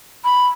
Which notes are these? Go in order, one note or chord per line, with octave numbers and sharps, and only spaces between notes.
B5